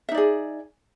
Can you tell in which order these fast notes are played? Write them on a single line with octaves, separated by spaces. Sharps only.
E5 D#4 D5 G#4